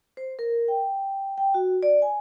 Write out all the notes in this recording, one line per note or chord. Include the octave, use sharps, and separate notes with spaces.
C5
A#4
G5
G5
F#4
D5
G#5